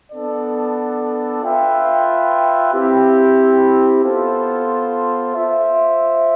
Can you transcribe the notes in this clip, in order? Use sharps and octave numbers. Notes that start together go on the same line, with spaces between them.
B3 D4 A4 D5
F4 B4 E5 G5
C4 E4 G4
B3 F4 A4 C5
F4 C5 E5